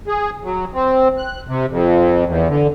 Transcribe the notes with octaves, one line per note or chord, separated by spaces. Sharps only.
G#4
F#3
C4
F#6
C3
F2
E2
D3